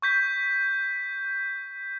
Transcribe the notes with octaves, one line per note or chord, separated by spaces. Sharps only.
C#6 G6 B6